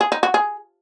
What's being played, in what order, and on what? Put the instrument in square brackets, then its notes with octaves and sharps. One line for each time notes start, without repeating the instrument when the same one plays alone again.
[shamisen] G#4
D#4
F#4
G#4